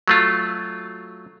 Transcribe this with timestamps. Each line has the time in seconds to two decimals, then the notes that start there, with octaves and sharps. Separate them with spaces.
0.08 F#3 A3 F4